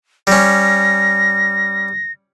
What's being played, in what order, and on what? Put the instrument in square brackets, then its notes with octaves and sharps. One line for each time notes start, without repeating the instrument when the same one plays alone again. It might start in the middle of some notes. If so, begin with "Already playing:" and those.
[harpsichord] G3 C#4 [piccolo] A#6